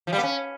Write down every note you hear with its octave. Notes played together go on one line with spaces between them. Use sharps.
F3
G3
B3
C#4